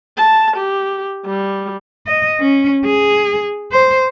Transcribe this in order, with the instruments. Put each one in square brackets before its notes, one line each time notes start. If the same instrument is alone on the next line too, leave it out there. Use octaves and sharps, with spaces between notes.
[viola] A5
G4
G3
[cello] D#5
C#4
G#4
C5